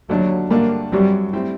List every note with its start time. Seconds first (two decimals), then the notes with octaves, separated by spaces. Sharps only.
0.09 D#2 D3 F#3 A3 D4
0.51 G2 D3 A3 A#3 D4
0.92 F#2 F#3 G3 C4
1.33 A2 G3 C4